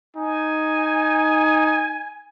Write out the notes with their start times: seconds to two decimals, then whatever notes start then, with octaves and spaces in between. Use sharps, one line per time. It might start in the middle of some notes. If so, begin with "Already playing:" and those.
0.16 D#4 G#5